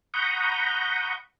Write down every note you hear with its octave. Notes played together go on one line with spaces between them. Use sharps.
F#5 A#5 B5 C#6 D#6 G6